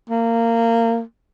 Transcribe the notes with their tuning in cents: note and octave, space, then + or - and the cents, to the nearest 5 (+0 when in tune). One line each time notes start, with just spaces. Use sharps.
A#3 -20